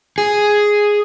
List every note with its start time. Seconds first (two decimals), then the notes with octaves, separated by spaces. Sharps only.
0.18 G#4